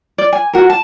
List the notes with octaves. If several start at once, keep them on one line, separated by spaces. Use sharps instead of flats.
D5
G#5
F#4 A#4
A5